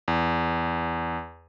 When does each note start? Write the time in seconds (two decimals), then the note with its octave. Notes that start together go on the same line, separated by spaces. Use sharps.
0.08 E2